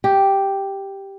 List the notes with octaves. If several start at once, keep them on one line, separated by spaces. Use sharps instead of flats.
G4